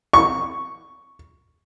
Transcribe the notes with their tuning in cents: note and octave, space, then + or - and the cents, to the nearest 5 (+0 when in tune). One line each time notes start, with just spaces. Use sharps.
C#6 +0